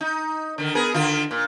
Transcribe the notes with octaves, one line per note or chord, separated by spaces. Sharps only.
D#4
D3 D#3
B3 G#4 A#4
D3 D#3 F4
A#2